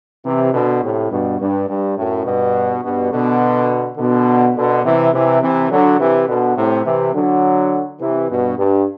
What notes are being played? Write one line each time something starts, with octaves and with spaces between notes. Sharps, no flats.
C3 E3
B2 D3
A2 C3
G2 B2
G2
G2
F#2 A2
G2 B2
G2 B2
B2 D3
B2 D3
B2 D3
C3 E3
C3 E3
C3 E3
D3 F#3
C3 E3
B2 D3
A2 C3
C3 E3
D3 F#3
C3 E3
G2 B2
G2